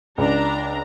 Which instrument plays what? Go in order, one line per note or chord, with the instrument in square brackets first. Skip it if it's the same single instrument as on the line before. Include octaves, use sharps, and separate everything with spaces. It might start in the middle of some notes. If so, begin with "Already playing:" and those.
[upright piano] C#2 [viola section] D4 A#5